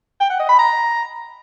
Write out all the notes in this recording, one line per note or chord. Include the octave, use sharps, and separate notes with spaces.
G5
F#5
D#5
B5
A#5